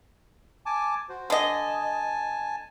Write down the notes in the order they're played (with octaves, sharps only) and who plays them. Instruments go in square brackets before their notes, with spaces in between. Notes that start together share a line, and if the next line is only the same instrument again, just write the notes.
[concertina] G#5 A5 D6
F#4 C5
[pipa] D3 D#5 [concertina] G#5 A5